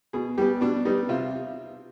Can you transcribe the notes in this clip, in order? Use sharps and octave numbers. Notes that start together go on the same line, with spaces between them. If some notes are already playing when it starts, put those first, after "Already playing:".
B2 G#4
G3 B3 G4
B2 D4
G3 B3 D#4
C3 F4